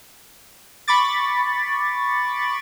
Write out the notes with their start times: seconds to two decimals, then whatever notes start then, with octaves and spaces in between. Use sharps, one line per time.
0.88 B5 C#6 D6 A6